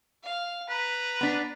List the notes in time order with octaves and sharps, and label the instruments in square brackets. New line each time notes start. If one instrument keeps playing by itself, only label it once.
[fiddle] F5
[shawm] B4 [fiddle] A#5
[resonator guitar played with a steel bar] B3 D4